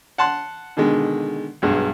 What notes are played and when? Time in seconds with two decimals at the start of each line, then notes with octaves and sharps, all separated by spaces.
0.18 F#5 A5 C6 F#6
0.77 B2 D3 D#3 G#3
1.62 B1 G2 G#3